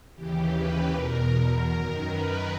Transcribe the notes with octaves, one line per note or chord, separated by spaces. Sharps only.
D#2 C#3 E3 G4
B4
E2 B2 A#4
A#4
F#2 D#3 A#4
B4